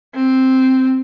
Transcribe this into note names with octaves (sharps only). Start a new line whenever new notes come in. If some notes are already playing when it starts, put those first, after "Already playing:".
C4